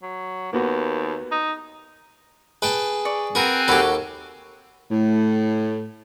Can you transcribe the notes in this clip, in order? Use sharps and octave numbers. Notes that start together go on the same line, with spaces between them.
F#3
D#2 A#3 B3 F#4
D#4
G#4 B4 G5 A5
D5 C#6
C4 F#4 A#4 B4 G#5 F#6
D#2 F#4 G4 A4 C#5 B5
A2